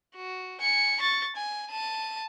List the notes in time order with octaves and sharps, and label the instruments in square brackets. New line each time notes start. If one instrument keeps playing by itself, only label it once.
[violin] F#4
G#5 C#7
C#6 A6
G#5
A5 D#7